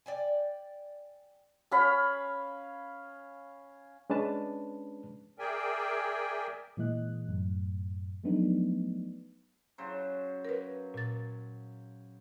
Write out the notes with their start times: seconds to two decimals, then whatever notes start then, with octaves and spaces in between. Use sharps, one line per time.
0.06 D5 G5 G#5
1.71 C#4 F5 B5
4.10 G#3 C#4 D4 B4 A5
5.39 G#4 A#4 D5 E5 G5 G#5
6.77 A#2 E3 G#3 D#5 F#6
7.29 F#2 A2
8.24 F3 F#3 A3 B3 D4 D#4
9.78 C#3 F#3 C5
10.45 A#4 B4
10.94 A#2 A6